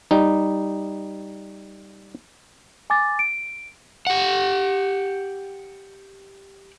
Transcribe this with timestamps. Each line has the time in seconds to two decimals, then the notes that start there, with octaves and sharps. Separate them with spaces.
0.11 G3 D#4
2.90 G#5 D6 A6
3.19 D7
4.07 G4 F#5